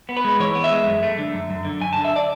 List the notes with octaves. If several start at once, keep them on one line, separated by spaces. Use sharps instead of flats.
B3
B4
G#3
E3 C#5
B3
E5
G#3
F#2
A3
D3
F#2
F#2
D3
F#2 G#5
D3 A5
E5
D5